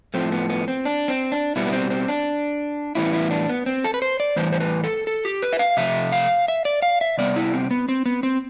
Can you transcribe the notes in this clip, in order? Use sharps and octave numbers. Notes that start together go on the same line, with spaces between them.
A2 F3 A3 C4
B3
B3
C4
D4
C4
D4
B2 G3 B3 E4
B3
C4
C4
D4
A2 E3 G3 B3 E4
E4
D4
B3
C4
A4
B4
C5
D5
A2 E3 G3 B3 C5
C5
B4
A4
A4
G4
B4
E5
F5
C3 F3 A3 E5
F5
E5
D5
F5
E5
C3 G3 B3 D5
E4
C4
B3
C4
B3
C4